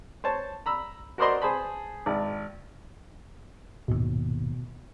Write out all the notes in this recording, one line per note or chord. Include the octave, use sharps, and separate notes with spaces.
C5 C#5 A5
A#5 B5 E6
F#4 A#4 C5 D5 D#5 C6
G#4 C5 A5 B5
G#1 D5
D#1 G#1 D#2 B2